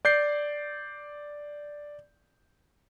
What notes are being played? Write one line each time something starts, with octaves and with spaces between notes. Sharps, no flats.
D5 G6 C7